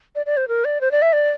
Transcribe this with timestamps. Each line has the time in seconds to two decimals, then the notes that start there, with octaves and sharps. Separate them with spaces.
0.15 D5
0.26 D5
0.37 C5
0.48 A#4
0.65 D5
0.81 C5
0.92 D5
1.02 E5
1.13 D5